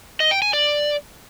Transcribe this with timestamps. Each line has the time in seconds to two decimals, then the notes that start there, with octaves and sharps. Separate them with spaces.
0.20 D#5
0.31 G5
0.42 G#5
0.53 D5